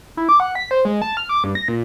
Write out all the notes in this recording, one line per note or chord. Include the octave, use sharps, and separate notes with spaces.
E4
D6
F#5
B6
C5
G#3
A5
F6
D6
G2
A#6
A#2